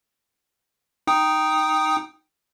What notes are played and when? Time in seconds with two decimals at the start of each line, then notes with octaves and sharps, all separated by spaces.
1.07 D#4 G5 D#6